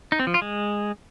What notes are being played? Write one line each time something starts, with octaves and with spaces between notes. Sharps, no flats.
D#4
C4
F3
F4
G#3